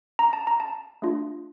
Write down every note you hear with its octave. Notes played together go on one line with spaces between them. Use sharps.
A#5
A5
A#5
A5
A3 D4 F4